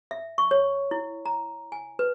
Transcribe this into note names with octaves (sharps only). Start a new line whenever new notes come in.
E5
C#6
C#5
E4
A#5
G#5
B4